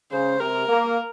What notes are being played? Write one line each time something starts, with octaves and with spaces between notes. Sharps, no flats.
C#3 C5
C3 A#4
A#3